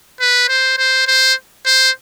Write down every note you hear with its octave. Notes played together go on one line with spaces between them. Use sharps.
B4
C5
C5
C5
C5